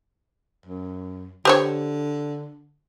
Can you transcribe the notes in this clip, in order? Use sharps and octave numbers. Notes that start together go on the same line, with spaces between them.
F#2
D3 G4 C5 C#5